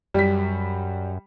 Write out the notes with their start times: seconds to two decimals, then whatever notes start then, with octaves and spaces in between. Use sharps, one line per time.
0.14 F#2 G3 B6